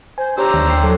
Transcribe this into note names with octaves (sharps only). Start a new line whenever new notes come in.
C5 G#5
D4 G4 C5 C#5 A#5 E6
D#2
C#5 G5 C7
F#3 A4